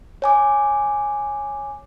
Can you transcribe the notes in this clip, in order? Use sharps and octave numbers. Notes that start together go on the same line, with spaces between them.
C#5 G#5 D6